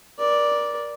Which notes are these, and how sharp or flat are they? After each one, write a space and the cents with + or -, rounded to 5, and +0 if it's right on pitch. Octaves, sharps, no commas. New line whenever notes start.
A#4 +35 D5 +0